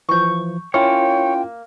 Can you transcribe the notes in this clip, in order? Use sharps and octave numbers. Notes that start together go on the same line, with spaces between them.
E3 F3 C#6 G6
A#3 C#4 E4 F4 C#5 G5